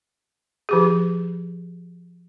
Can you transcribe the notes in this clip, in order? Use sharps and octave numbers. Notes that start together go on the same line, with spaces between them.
F3 G4 G#4